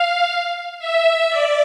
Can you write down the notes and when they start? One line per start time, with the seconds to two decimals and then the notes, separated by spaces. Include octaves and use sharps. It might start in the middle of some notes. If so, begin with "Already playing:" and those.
Already playing: F5
0.79 E5
1.29 D5